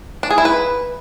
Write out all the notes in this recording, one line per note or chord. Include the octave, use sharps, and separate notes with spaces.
D4
G#4
E4
B4